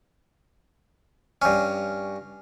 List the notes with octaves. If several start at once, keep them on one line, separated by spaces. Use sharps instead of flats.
G2 C#4